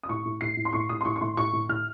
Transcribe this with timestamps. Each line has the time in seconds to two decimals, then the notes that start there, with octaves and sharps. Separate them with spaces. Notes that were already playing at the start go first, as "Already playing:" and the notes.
0.03 D#6
0.09 A2 C#6
0.25 A2
0.41 A2 C7
0.57 A2
0.65 C6
0.73 A2 C#6
0.89 A2 D#6
1.01 C6
1.05 A2 C#6
1.16 C#6
1.21 A2 C6
1.37 A2 C#6
1.53 A2
1.69 A2 F6